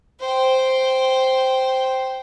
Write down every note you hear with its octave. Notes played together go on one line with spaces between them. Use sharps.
C5 G5